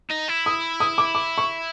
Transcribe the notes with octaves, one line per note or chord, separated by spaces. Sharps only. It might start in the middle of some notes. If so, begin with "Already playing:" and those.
D#4
E4
D#6
D#6
D6
D6
C#6